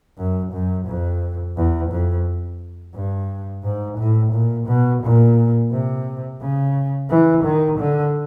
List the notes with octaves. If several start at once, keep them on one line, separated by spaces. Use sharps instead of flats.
F#2
F#2
F2
E2
F2
G2
G#2
A2
A#2
B2
A#2
C3
C#3
E3
D#3
D3